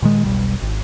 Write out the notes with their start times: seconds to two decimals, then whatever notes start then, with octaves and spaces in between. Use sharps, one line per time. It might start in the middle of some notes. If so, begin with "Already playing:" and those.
0.02 A#2 D#3 G#3
0.25 E1 B1 G3
0.62 G#1